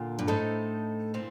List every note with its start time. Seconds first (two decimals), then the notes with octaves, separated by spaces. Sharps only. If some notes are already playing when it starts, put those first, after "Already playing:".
Already playing: A#2 D3 F4
0.19 G2
0.27 A2 A3 D#4 A4 C5
1.14 A#2 C4